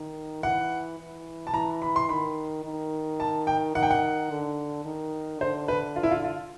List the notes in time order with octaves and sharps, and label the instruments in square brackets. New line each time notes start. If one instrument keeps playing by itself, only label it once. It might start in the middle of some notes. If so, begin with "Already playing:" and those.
Already playing: [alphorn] D#3
[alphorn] E3 [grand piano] F#5
[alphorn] E3
[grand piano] A5
[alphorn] E3 [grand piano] A#5
[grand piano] B5
C6
[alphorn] D#3 [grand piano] B5
[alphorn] D#3
[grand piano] A5
G5
[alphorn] D#3 [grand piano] F#5
[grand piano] G5
F#5
[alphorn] D3
D#3
[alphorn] D3 [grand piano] C5
[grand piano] B4
F4
E4
F4
F4